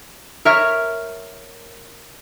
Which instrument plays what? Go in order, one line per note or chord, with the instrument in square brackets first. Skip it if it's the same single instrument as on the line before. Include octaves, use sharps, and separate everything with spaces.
[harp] A#4 C#5 E5 F6